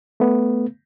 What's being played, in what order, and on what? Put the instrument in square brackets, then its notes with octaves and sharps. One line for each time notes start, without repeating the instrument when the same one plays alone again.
[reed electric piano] A3 B3